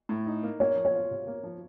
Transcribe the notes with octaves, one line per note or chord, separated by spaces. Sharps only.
A2
D#4
A#3
A#3 C#5
F3
C#5
F4
C3
A#3
F3